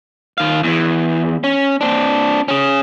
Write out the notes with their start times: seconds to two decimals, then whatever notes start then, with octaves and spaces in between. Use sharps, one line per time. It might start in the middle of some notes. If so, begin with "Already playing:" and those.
0.38 D#3 F5
0.63 E2 E3
1.44 C#4
1.81 C4 D4
2.48 C#4 G#4